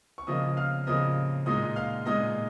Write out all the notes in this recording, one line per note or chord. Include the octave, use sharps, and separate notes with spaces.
C#6
C#3 F3 A#3 F4 D#5 D#6
F5 F6
C#3 F3 A#3 F4 D#5 D#6
A#2 G#3 D#4 D#5 D#6
F5 F6
A#2 G#3 D#4 D#5 D#6